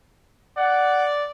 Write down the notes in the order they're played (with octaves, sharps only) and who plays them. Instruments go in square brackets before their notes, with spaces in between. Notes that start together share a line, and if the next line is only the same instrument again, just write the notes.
[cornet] D5 [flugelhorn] F#5